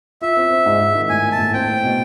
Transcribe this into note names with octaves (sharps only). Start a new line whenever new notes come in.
F4 E5
C4
C4
G#2
G#2
D#3
A2 G#5
A#3
A5
A2
C4 G5
C4
B2